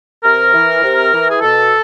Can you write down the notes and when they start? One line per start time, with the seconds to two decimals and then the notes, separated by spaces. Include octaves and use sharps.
0.24 C3 A#4
0.53 E3
0.83 C3
1.12 E3
1.30 G#4
1.41 B2 A4